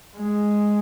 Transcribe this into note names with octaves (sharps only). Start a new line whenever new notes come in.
G#3